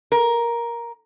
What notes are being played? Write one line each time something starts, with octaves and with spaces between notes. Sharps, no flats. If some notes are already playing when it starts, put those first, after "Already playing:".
A#4